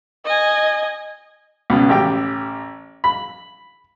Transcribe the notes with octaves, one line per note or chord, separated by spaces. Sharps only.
D#5 G#5
C#2 B2
A1 G4 G5
B5